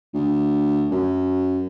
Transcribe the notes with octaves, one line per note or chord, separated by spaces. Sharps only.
D2
F#2